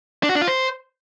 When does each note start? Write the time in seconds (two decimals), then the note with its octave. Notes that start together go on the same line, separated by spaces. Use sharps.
0.23 D4
0.29 F#4
0.35 D4
0.41 F4
0.48 C5